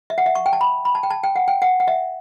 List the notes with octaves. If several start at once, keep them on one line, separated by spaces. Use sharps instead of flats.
E5
F#5
E5
C#6
G5
A5
B5
B5
A5
G5
A5
G5
F#5
G5
F#5
F#5
E5